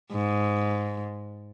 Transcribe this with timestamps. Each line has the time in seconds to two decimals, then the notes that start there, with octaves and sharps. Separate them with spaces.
0.11 G#2